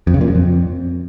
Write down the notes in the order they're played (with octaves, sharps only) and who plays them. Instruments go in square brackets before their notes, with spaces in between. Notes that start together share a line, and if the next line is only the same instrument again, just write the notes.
[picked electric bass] F2
C#3
A#2
F#2
F2